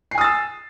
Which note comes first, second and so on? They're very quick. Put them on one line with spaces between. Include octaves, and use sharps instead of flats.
C7 G#5 D#6 A6 E6